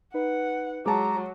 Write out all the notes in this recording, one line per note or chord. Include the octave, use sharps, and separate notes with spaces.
D#4 B4 F#5
F#3 G#3 A5 A#5 D6